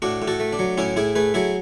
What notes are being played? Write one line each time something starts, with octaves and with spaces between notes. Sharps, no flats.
A2 D4 F#4
A2
F#4 A4
A3
D4
F#3
A2 C#4 E4
A2 E4 G#4
A3 G#4 B4
F#3 E4 G#4